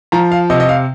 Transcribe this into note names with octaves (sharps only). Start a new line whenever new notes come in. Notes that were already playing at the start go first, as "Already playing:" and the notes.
F3 A#5
F5
C3 D#5
D#5
F5